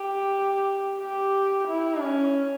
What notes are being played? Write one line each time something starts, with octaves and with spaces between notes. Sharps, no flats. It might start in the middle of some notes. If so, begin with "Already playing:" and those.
Already playing: G4
G4
E4
C#4